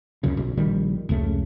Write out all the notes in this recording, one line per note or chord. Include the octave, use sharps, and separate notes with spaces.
C#2 F#2 C#3
B1
A#1 D#3 G3
F1 C#2 C#3 A3